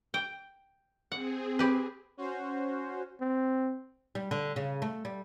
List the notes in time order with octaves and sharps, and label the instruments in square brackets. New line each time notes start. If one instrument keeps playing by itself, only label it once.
[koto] G5
[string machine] C4 G#4 [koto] F#5
[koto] G4 B4
[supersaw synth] C#4 F#4 C5
[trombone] C4
[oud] G3
D3
C#3
A3
G3